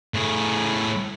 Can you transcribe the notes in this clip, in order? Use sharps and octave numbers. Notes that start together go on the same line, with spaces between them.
A2 G#4